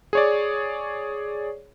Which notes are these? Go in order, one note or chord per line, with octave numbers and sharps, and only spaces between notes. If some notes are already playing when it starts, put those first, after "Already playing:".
G#4 C#5 D5